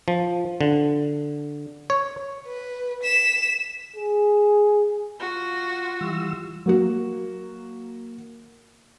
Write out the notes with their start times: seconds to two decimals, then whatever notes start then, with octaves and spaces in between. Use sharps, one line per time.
0.08 F3
0.61 D3
1.90 C#5
2.47 B4
3.03 B6 E7
3.96 G#4
5.20 F4 F#4
6.01 E3 G3 E6
6.66 F#3 A#3 F#4